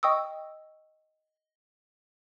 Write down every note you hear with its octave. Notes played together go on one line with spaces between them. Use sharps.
D#5 G5 C#6 D#6 E6